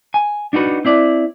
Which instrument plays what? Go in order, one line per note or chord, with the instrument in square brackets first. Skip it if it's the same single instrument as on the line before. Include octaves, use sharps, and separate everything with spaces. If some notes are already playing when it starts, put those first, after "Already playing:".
[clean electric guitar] G#5
D4 D#4 F#4 B4
C4 E4 D5